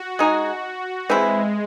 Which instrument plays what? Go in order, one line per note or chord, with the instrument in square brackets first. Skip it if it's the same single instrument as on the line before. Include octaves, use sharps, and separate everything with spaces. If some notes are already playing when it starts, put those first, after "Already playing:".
Already playing: [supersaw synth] F#4
[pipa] G#3 D#4 G#4
[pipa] E3 C4 E4 [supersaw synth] G#3